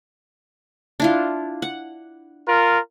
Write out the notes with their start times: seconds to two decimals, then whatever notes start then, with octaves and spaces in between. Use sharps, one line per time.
1.00 D4 E4 F4
1.62 F#5
2.47 F4 A#4